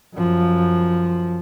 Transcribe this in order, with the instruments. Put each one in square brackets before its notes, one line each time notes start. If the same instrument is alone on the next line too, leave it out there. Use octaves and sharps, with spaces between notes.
[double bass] F#2 F3